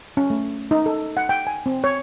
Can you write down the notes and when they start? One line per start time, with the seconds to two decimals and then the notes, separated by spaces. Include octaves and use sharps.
0.17 C#4
0.30 A3
0.71 D#4
0.86 A4
1.17 F#5
1.29 G5
1.47 G#5
1.66 C4
1.84 C#5